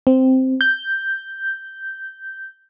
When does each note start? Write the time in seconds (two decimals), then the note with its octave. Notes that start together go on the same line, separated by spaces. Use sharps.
0.07 C4
0.61 G6